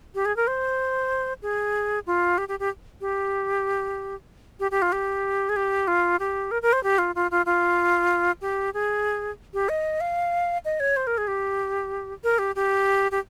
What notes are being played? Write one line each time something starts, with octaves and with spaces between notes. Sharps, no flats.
G4
G#4
A#4
C5
G#4
F4
G4
G4
G4
G4
G4
G4
F4
G4
G#4
G4
F4
G4
A#4
A#4
C5
G4
F4
F4
F4
F4
G4
G#4
G4
D#5
F5
D#5
C#5
C5
A#4
G#4
G4
A#4
G4
G4
G4